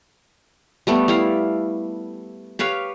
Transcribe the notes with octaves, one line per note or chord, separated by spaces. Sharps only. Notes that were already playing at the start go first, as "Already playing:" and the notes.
G3 A3 B3
G3 E4 F5
G4 B4 C#5 F5